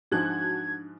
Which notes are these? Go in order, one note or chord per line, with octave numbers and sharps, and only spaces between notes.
G#2 F3 D4 F#4 A5 F#6 G#6